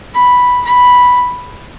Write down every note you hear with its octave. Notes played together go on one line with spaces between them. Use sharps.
B5
B5